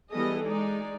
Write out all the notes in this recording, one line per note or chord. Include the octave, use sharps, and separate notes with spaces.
E3 G3 B3 G#4 A4 D#5
G#3 D#4 D5